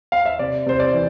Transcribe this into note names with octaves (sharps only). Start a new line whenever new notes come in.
F5
E5
C3 D5
C3 C5
D5
E3